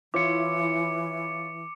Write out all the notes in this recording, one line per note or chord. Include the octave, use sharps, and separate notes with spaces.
E3 E4 F4 C#5 D6 C#7